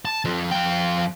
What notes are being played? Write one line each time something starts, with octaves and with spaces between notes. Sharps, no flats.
A5
F3 C4
F2 G5